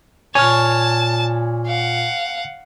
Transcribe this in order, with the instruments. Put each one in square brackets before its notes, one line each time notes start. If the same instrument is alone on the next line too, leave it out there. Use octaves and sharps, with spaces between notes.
[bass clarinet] A#2 [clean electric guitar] C#5 [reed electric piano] G#5 F6 [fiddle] A5
[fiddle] F5 F#5